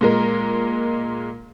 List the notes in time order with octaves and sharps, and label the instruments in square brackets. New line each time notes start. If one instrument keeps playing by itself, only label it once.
[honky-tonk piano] A#2 G#3 A#4